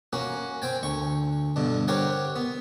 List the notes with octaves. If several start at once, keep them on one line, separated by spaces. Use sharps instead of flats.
A#3 C#4 F#4
C4 G5 G#5
D2 C#6
G2 B2 D3
C4 G4 A#4 C#5 F#5
B3